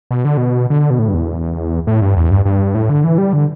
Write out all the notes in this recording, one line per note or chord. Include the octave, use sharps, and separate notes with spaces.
B2
D3
B2
D3
B2
A2
G2
E2
A2
G2
E2
G2
G2
A2
D3
E3
G3
D3